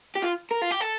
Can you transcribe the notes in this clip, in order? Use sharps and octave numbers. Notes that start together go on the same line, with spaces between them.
G4
F4
A#4
F4
G4
A4